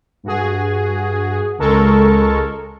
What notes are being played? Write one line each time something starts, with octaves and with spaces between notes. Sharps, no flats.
G2 F#4 G#4
C#2 G#3 A4 A#4 C#6